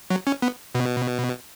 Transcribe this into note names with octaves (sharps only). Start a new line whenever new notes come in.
F#3
C#4
B3
B2